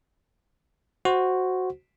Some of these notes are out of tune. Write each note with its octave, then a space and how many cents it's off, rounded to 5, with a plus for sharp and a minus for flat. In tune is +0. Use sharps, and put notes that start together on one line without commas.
F#4 +0 C5 +0